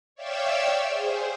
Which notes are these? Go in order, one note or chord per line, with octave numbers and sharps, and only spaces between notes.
C#5 D5 E5 F5 G5 E6
G#4 C5